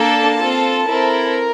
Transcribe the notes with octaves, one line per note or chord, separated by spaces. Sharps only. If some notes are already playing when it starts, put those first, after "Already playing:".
Already playing: A#3 D4 A4 A5
C4 F4 A4
C4 E4 A4 A#4